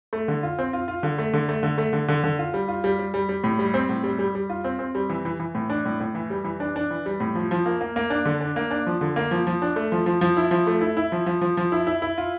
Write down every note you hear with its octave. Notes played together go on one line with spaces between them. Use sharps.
A3
D3
F4
C4
F4
F4
D3
A3
D3
A3
D3
A3
D3
D3
D3
F4
G3
F4
G3
G3
G3
G3
A2
G3
C4
A2
G3
G3
G3
F4
C4
C4
G3
E3
E3
E3
A2
D4
A2
A2
E3
G3
E3
D4
D4
E3
G3
A2
F3
F3
A#3
A#3
A#3
D4
D3
D4
A#3
D4
F3
D3
A#3
F3
F3
D4
A3
F3
F3
F3
E4
F3
A3
E4
E4
F3
F3
F3
F3
E4
E4
E4
F4